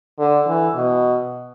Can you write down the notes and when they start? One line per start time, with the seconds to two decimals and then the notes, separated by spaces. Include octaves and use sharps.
0.19 D3
0.48 E3
0.76 B2